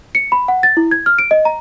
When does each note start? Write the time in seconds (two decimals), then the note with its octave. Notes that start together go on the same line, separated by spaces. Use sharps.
0.15 C#7
0.32 B5
0.48 F#5
0.63 A6
0.77 E4
0.91 G#6
1.06 F6
1.19 D7
1.31 D#5
1.45 A#5